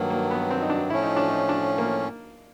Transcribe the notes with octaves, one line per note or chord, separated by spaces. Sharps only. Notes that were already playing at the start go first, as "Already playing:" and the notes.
Already playing: G2 D#3 F#3 A#3
A#3
B3
C4
D#4
D4
A2 F3 A3 C#4 E4
D#4
D4
D#4
D4
A#3